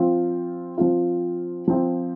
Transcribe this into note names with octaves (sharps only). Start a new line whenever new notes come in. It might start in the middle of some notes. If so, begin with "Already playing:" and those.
Already playing: F3 C4 F4
F3 C4 F4
F3 C4 F4